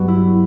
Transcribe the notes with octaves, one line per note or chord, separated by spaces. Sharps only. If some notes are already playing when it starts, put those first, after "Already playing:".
Already playing: G2 F#3 B3 D4 F#4
E4